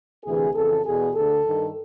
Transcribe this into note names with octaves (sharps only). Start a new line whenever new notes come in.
D2 C3 E3 G#4
F2 C#3 E3 A4
E2 B2 G#4
D2 D3 A4
G2 D#3